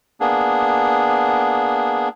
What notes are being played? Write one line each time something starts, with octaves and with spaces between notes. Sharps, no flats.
A#3 B3 D4 G#4